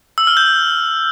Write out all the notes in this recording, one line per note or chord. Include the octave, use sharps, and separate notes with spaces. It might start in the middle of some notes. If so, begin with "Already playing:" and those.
E6
F6
G6